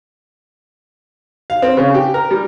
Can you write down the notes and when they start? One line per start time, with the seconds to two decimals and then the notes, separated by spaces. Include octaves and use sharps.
1.50 F5
1.62 C4
1.77 C#3
1.94 G4
2.14 A#4
2.31 G3